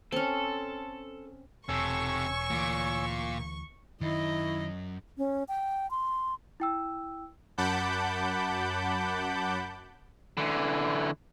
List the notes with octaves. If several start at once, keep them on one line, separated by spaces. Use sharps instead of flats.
C4 C#4 A4
E1 C3 A4 C#5 G#5 C#6 E6
D2 A#2 E3
F#2 D#3 E4 D#5
C#4
G5
C6
E4 G5 E6
F#2 F#5 A5 B5 D6 G6
D3 E3